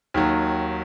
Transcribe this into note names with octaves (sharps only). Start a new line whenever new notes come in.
D#2 D#3 F#3